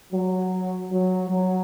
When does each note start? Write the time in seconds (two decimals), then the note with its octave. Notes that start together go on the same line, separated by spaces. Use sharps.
0.12 F#3
0.91 F#3
1.29 F#3